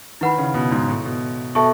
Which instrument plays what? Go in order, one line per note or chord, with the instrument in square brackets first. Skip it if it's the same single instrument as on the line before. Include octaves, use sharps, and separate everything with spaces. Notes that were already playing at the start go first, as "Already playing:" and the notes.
[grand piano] D#3 [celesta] E4 B4 F#5 B5
[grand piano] C#3
B2
G#2
A2
B2
[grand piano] B2 [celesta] A4 E5 A5 C#6